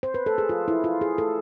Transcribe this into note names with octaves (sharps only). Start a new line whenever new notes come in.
C5
B4
A4
G#4
F4
E4
F4
G#4
A4